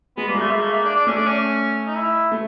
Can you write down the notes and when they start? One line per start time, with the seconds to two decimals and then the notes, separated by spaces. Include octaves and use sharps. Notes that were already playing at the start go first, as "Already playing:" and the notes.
0.17 G#3 B3
0.26 G3 A#3
0.35 G#3 A3
0.51 A#3
0.62 A3
0.73 A#3
0.85 D4
0.95 D4
1.07 A3 C#4
1.16 D4
1.27 C#4
1.87 D#4
1.96 E4
2.32 A3